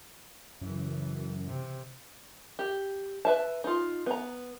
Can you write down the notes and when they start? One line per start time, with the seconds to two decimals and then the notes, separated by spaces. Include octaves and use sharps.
0.61 F#2 C#3 E3
1.47 C3
2.59 G4
3.25 B4 E5 A5
3.64 D#4 F4
4.06 B3 A#5